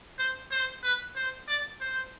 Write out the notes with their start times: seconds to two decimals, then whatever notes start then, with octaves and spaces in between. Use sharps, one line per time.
0.19 C5
0.51 C5
0.83 B4
1.16 C5
1.48 D5
1.81 C5